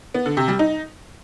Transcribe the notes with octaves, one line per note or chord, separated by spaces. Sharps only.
B3
D3
C3
G3
D#4